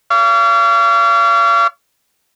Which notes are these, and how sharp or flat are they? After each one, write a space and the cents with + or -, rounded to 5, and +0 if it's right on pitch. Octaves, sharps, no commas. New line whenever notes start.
C#5 +45 F5 -30